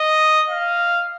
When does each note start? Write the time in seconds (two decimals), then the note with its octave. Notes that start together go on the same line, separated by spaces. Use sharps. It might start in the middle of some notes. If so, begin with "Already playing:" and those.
Already playing: D#5
0.50 F5